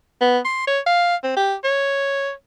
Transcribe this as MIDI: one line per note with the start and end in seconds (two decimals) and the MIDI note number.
0.21 0.39 59
0.45 0.65 84
0.67 0.80 73
0.86 1.16 77
1.24 1.35 60
1.37 1.55 67
1.64 2.31 73